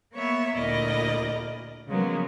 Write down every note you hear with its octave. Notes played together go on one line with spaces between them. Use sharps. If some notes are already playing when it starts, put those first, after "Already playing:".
A#3 B3 C#5 E5
D2 A#2 E4 A#4 D5 D#5
C#3 F3 F#3 G#3 A#3 B3